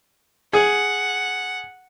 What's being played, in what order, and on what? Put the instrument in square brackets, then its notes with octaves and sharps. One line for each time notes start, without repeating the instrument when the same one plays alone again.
[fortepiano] G#4 [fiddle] F#5